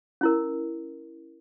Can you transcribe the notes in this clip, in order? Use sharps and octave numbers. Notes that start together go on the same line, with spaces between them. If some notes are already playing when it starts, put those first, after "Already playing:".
C#4 E4 A#4